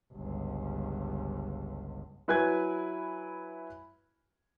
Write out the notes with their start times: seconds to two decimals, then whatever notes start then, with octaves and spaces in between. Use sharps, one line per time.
0.13 G1 C#2
2.28 F#3 E4 B4 G#5 B5 G#6